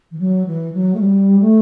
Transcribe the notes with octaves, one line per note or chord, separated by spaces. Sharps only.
E3
F#3
E3
F#3
A3
G3
A3